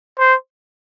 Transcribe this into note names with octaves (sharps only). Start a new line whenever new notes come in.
C5